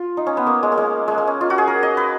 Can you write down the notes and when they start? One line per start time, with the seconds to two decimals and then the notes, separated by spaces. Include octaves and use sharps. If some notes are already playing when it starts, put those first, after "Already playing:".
Already playing: F4
0.17 D#4
0.27 C#4
0.37 B3
0.47 A#3
0.63 G#3
0.72 A#3
0.78 G#3
1.08 G#3
1.18 A#3
1.27 C#4
1.41 F4
1.50 F#4
1.58 G#4
1.68 A#4
1.83 D#5
1.97 B4